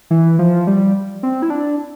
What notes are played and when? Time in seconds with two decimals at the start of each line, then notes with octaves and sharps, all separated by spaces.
0.10 E3
0.39 F3
0.67 G3
1.23 C4
1.42 E4
1.50 D4